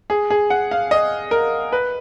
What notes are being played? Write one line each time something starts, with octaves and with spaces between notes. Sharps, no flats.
G#4
G#4
F#5
F5
D#5
A#4
B4